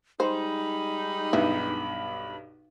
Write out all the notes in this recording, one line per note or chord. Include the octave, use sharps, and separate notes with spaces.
G3 G#3 D#4 C5 B5
B1 G2 B3 E4